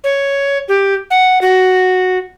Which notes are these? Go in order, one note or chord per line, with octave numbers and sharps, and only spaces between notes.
C#5
G4
F#5
F#4